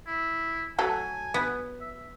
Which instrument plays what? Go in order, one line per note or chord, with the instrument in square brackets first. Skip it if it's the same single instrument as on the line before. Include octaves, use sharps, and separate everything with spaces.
[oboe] E4
[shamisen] F#3 A3 A4 [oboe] G#5
[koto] B3
[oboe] E5